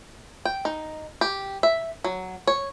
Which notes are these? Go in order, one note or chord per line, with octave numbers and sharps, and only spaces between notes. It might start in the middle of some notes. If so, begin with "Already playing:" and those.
G5
D#4
G4
E5
F#3
C#5